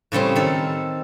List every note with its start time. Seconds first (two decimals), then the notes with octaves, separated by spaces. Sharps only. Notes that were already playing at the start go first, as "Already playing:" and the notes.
0.12 A2 C#3 G3 C4
0.35 D#3 A4